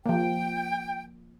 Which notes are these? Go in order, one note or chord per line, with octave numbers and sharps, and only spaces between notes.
F3 A#3 G5